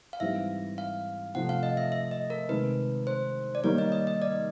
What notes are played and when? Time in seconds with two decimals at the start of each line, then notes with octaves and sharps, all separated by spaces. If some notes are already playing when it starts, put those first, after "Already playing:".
0.13 F5
0.20 G#2 E3 G3 C4 E5
0.78 F5
1.35 C3 F3 A3 F#5
1.49 F5
1.63 D#5
1.77 E5
1.92 E5
2.11 D#5
2.30 A#4
2.49 C3 D#3 G#3 B4
3.07 C5
3.55 D5
3.64 D#3 G3 A#3 D#4 C#5
3.78 D#5
3.92 D#5
4.07 D#5
4.22 D5